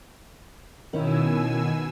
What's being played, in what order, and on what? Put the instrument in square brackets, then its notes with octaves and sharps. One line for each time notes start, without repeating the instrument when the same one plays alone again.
[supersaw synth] B2 G#5 E6 [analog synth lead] D#3 [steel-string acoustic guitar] C#4 D#4 E4